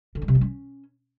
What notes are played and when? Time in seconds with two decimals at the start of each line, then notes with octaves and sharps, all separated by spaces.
0.15 D3
0.22 G3
0.28 C3
0.35 G3
0.41 C#4